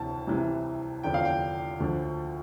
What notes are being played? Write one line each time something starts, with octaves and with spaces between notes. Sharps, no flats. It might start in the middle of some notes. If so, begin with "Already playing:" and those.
Already playing: D2 C3 E3 A5
C2 C3 E3
E2 D3 F3 G5
F5
G5
D2 D3 F3